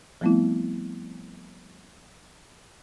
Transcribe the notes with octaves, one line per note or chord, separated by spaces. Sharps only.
F3 G3 A3 B3 C4 E4